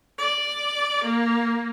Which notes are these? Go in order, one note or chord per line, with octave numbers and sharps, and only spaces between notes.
D5
A#3